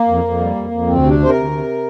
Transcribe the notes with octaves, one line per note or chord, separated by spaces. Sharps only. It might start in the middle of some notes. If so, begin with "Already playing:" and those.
Already playing: A#3
F2
F2
G3
F2
F2
D2 C4
C3
D4
C3 C5
A#4
D2
C3